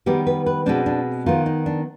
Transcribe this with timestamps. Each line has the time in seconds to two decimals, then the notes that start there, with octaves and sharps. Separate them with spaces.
0.06 D#3 G3 B3 G4
0.27 B4
0.46 B4
0.66 B2 G#3 C4 D4
0.86 D4
1.26 D#3 B3 F4
1.46 D#4
1.66 D4